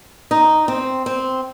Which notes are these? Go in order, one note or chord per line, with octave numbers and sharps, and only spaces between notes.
D#4
C4
C4